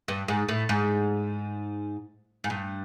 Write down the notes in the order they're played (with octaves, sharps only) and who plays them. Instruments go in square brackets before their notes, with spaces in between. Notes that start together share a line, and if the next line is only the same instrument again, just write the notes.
[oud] G2
G#2
A2
G#2
G#2
G2